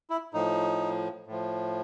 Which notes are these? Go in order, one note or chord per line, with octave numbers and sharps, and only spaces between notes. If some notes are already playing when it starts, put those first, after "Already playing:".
E4
A2 F3 D#4
A2 F3